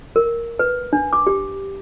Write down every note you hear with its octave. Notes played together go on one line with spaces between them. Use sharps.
A#4
B4
D4
D6
G4